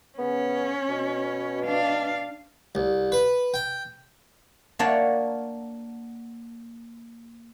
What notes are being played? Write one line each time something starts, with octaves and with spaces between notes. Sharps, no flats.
C#3 B3 C#4
B2
D4 F5
C2
B4
G5
A#3 D4 C#5 F#5 A5 A#5